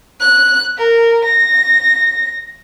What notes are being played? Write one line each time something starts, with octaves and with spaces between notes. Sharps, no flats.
F#6
A#4
A#6